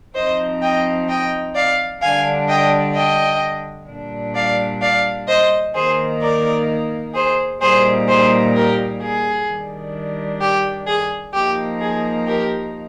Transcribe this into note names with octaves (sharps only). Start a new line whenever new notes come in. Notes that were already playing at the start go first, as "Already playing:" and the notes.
F3 C4 D#4 C5 D#5
D#5 G5
D#5 G5
D5 F5
D3 G3 D4 F5 G#5
D#5 G5
D#5 G5
A#2 G3 D4
D5 F5
D5 F5
C5 D#5
D#3 A#3 D#4 G#4 C5
A#4 D5
G#4 C5
A#2 G3 A#3 D#4 G#4 C5
G#4 C5
G4 A#4
G#4
D#3 G3 D4
G4
G#4
F3 A#3 D#4 G4
G#4
G4 A#4